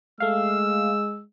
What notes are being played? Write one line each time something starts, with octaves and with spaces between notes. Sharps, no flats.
G#3 A3 F5 E6